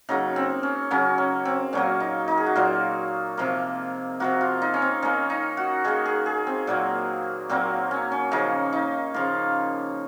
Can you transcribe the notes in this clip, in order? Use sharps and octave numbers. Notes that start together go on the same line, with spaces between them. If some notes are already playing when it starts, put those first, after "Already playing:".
C#3 F#3 A#3 D#4
C4
C#4
C#3 F#3 A#3 C#4
C#4
C4
A#2 F#3 A#3 C#4
D#4
D#4
G#4
F#4
A#2 F#3 A#3 F4
C3 F3 A#3
C3 F3 A#3 F#4
F4
D#4
C#4
C4
D#3 A#3 C#4
D#4
F#4
D#3 A#3 G#4
G#4
G#4
C4
A#2 F#3 A#3
A#2 F#3 A#3 C4
C#4
C#4
C#3 F3 A#3 D#4
D#4
C#3 F3 A#3 F4